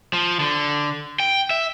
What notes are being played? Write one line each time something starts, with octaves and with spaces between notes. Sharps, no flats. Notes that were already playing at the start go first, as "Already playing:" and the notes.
F3
D3
G5
E5